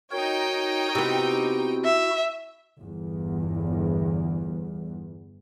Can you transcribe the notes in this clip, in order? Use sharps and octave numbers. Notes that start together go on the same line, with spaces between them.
D#4 F#4 A#4 C#5 G5
C3 B3 E4 F#4
E5
G1 E2